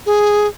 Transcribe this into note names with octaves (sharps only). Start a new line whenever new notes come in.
G#4